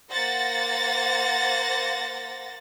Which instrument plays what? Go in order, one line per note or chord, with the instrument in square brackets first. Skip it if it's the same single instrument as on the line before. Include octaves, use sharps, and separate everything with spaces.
[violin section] A#3 C5 F#5 A6 A#6